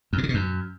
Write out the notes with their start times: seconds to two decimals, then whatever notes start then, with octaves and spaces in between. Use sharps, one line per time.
0.13 F2
0.18 A2
0.23 C#3
0.29 B2
0.34 F#2